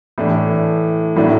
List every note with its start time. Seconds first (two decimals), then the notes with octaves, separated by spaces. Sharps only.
0.18 A2 E3 A3 D4
1.16 A2 F#3 A3 D4